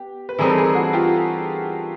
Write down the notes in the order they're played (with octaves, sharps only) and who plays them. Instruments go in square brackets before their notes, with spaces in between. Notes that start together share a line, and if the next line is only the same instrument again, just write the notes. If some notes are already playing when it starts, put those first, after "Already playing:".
Already playing: [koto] B3 [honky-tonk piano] G4
[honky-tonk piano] B4
[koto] E3 G3 C4 D#4 [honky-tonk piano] G#4 A#4
[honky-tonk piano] A4
G#4 A#4
F#4 G#4
F4 G4